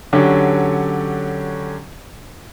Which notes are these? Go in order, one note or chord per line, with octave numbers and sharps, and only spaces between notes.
D3 F#3 C#4 D4 G4